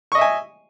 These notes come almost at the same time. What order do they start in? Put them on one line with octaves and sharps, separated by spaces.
C#6 D#5 E5 G#5